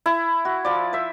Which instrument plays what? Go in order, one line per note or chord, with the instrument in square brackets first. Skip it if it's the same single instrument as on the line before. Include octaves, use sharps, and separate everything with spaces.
[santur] E4
[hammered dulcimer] F#4
F3 D5
C5 E5